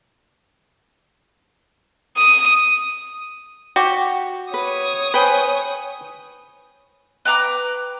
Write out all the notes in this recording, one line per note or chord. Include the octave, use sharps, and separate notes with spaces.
D#6
F#4 G4
B4 C#5 D#6
B4 C5 G5 G#5
B4 G5 A#5 D6